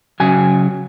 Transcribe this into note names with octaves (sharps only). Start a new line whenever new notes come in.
C#3 F#3 G#5